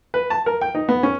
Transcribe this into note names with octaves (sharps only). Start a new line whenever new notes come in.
B4
A5
A#4
G5
D#4
B3
C#4